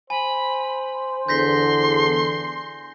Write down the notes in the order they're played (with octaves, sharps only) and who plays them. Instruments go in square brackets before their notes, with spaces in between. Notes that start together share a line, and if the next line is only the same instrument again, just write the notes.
[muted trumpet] C5 [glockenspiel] G#5 [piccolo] B5
[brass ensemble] E2 D3 [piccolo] C6 [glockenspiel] G6 A#6 B6